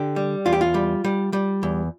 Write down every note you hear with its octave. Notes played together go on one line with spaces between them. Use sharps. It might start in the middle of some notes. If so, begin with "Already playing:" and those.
Already playing: D3 G4
G3
E2 F4
G4
F4
G3
G3
G3
E2